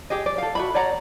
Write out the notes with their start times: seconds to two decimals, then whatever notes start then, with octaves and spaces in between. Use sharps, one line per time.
0.10 G4 G#4 D#5
0.26 D5
0.38 A4 F5
0.55 F#4 E5 B5
0.74 C#5 D5 F#5 A#5